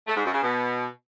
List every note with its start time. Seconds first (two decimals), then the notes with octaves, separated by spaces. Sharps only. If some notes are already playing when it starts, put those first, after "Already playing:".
0.08 A3
0.16 G#2
0.25 F#2
0.34 C#3
0.42 B2